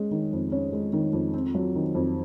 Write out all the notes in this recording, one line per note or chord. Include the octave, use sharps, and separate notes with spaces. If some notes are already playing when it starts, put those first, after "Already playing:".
Already playing: G#3 C#4
D#3
F2
C#4
G#3
D#3
F2
C4
F#3
D#3
F2